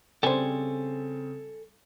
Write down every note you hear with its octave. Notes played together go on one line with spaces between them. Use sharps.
C#3 G3 C4 A4 C5 G#5